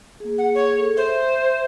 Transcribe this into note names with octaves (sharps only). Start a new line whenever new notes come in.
A#3 G#4
F#5
C#5
A4
C5 E5